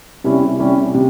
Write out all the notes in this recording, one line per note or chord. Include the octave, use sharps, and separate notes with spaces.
C3 G3 C#4 E4
C3 G3 C#4 E4
C3